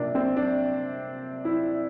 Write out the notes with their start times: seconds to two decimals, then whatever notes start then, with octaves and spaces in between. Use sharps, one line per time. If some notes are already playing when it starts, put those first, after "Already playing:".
Already playing: C3 F3 A#3 D4
0.15 C4
0.37 D4
1.45 E4